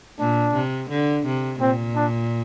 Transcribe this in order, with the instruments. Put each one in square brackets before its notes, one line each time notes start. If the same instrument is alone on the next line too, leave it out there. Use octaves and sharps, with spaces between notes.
[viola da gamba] A#2 [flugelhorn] D4
[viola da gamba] C3
D3
C3
[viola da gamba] A#2 [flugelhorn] C4
[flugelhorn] D4